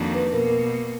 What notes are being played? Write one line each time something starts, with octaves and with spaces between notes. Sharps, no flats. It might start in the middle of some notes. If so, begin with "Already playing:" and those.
Already playing: F2 D#3 F#3 A#3 D4
B4
B2 A#3 A#4
A#4